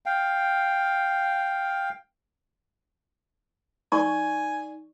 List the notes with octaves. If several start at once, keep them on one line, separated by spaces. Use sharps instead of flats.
F5 G5
D#4 D5 G#5 C#6